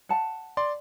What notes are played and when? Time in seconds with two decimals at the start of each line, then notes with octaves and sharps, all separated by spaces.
0.09 F#5 A5
0.57 D5 C6